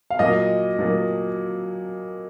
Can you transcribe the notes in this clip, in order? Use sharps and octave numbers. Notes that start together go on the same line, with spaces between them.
F5
A#2 F#3 D#5
A#2 F#3